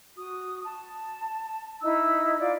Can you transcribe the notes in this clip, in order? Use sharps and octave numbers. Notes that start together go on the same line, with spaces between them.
F#4 D#6
A5
D#4 E4 E6
F4 D5